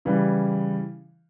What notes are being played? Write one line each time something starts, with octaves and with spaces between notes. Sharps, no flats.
C#3 E3 G3